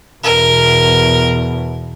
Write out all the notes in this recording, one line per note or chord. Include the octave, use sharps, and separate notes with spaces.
E2 B2 A#4